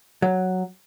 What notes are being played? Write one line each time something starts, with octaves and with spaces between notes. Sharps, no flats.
F#3